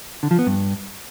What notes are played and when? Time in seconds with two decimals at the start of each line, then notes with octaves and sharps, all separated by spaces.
0.23 D3
0.31 F3
0.39 B3
0.47 G2